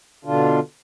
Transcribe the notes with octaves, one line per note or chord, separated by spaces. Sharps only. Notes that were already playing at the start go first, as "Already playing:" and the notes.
B2 D3 D4 F4